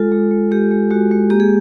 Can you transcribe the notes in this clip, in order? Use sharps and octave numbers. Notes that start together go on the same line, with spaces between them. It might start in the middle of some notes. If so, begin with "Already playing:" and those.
Already playing: G#3 F4 A4
G#3
G#3
G#3 G4
G#3
G#3 F#4
G#3
A#3 G4
G#4